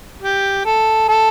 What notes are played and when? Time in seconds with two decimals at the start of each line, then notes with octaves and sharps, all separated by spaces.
0.22 G4
0.65 A4
1.08 A4